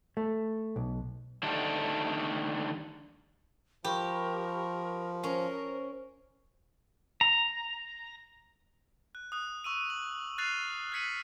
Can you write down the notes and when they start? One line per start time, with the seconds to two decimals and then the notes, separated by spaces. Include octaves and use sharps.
0.17 A3
0.76 B1
1.43 D3 D#3 G3 A3 D4
3.84 F3 G4 A#4 B5 C#6
5.24 C#4 A#4 C5
7.21 A#5
9.15 F#6
9.32 D#6 F#6
9.64 C#6 E6 D#7
9.90 F#7
10.38 F6 F#6 A6 C7 D#7 F7
10.92 F#6 G#6 B6 C#7 D#7 F#7